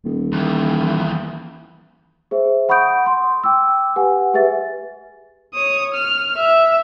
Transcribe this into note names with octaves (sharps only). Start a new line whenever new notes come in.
D#1
D#2 E3
G#4 C5 E5
F#5 B5 C#6 D#6 G6 D7
C6
G5 D6 E6
G4 B4 F#5 G#5
G4 G#4 B4 E5 A6
C#5 D#6
F6
E5